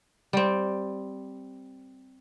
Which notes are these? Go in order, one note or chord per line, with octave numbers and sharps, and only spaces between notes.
G3 C4